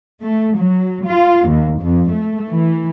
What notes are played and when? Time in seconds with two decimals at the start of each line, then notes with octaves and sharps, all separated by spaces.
0.21 A3
0.56 F#3
1.05 F4
1.45 D#2
1.78 F2
2.09 A3
2.49 E3